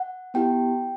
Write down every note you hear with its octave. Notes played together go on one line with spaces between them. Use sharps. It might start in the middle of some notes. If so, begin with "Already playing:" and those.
Already playing: F#5
B3 E4 G4 G5